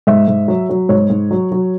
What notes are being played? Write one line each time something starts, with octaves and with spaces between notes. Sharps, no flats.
G#2 E5
G#2
F#3
F#3
G#2 C#5
G#2
F#3
F#3